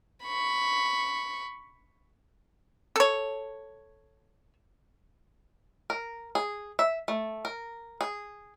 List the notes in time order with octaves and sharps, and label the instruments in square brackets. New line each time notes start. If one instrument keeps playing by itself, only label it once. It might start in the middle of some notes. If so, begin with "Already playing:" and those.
[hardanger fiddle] B5 C#6
[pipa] A4 C#5
[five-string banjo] A#4
G#4
E5
A3
A#4
G#4